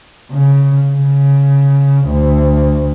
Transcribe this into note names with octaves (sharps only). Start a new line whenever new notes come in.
C#3
C#3
D2